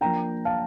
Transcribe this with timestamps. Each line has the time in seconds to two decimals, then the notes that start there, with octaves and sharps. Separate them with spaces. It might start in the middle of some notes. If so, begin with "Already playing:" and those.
0.01 F3 A#3 D4 G5 A#5
0.45 F5 A5